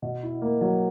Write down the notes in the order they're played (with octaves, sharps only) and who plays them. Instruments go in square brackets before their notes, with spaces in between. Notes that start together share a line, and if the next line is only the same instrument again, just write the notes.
[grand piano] B2
E4
A#3
F#3